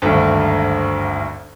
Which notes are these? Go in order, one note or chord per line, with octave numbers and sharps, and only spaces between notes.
G#1 D2 G2